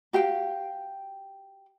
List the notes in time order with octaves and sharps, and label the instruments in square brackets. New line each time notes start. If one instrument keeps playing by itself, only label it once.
[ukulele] F#4 G4 F5 G5